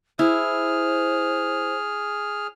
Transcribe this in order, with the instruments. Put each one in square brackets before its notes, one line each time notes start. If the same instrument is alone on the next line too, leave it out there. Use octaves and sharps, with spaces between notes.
[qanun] E4 [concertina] G#4 F6 [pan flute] C5